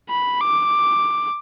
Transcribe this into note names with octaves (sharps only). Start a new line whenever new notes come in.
B5
D6